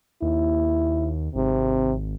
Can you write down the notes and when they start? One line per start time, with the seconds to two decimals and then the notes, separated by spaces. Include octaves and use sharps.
0.22 D#2 E4
1.35 G#1 C3